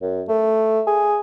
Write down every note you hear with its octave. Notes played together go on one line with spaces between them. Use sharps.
F#2
A3
G#4